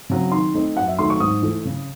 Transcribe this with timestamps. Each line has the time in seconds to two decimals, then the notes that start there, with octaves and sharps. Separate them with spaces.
0.10 C#3 F#3 C4
0.32 D#3 C6
0.54 A3 C4 D#4
0.76 F#2 F#5
0.88 E5
0.98 D#3 F#3 A3 C6
1.10 C#6
1.20 G#2 D#6
1.42 E3 A3
1.65 C#3